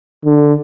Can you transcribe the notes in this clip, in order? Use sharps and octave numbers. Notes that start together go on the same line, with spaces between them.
D3